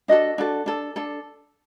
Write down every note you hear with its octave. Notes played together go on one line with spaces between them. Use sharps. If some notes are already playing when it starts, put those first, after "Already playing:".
D4 F#4 A4 D#5
D4 F#4 A4
D4 A4
D4 A4